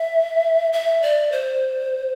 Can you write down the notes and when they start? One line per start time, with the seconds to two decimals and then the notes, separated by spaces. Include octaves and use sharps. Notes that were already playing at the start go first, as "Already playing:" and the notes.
Already playing: E5
0.73 E5
1.02 D5
1.32 C5